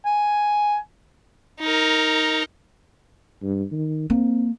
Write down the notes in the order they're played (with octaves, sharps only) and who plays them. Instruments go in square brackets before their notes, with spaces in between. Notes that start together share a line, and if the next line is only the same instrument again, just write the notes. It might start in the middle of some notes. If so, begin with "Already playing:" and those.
[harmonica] G#5
[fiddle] D#4 A#4
[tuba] G2
D#3
[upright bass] A#3 [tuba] C4